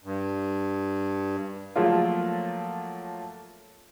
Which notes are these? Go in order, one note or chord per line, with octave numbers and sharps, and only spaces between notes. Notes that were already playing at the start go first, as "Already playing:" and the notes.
G2
F3 F#3 A3 A#3 F4